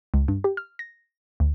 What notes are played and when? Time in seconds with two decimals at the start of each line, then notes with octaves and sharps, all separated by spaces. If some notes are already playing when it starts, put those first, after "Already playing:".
0.14 C#2
0.28 G2
0.44 G4
0.57 F6
0.79 A#6
1.40 D2